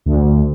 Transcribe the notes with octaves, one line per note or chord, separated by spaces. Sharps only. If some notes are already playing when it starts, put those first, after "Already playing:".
D2